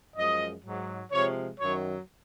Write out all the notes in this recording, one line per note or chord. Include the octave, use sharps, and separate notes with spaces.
F#2 F3 G#3 D#5
G#2 F#3
C3 F3 G#3 C#5
F#2 D#3 F#3 C#5